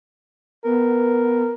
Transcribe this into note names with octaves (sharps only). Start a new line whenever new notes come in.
B3 A#4